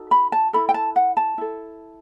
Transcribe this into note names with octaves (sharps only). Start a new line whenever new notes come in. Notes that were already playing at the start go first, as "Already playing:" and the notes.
Already playing: D#4 F#4 A4
B5
A5
E4 A4 B5
G5
A5
F#5
A5
E4 A4